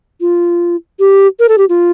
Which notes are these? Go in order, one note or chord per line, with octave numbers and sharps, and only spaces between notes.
F4
G4
A#4
A4
G4
F4